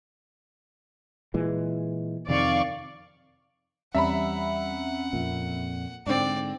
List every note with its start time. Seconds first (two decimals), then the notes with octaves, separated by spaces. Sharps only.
1.34 A#2 E3 G#3
2.29 F2 C3 D#3 D5 F5 C#6
3.95 E2 G3 C4 C#4 E5 F#5 A#5 B5
5.13 F2 A#2
6.06 G#2 D3 C4 D4 D5